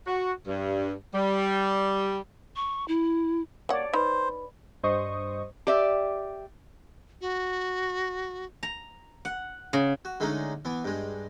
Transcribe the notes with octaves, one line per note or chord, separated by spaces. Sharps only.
F#4
G2
G3
C#6
E4
A#3 C#5 D5 F#5
D#4 B4 C5 B5
G2 C5 D#5 C#6 D#6
G4 D5 E5
F#4
A#5
F#5
C#3
F#4
D3 G#3 A3 C#4 D#4
E3 B3
G2 G#3